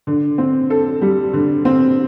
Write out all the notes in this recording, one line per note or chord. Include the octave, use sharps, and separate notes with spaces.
D3
C4
A4
G3
D3
C4